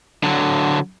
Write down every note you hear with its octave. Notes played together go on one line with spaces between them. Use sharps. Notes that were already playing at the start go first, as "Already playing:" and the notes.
D3 F#3